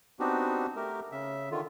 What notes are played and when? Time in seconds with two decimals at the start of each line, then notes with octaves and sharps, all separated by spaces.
0.20 B3 C4 D4 D#4 F#4 G4
0.76 A3 G4 A#4
1.12 C#3 E5
1.51 D3 D#3 F4